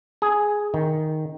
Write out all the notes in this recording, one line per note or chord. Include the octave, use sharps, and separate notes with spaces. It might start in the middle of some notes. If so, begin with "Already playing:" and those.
G#4
D#3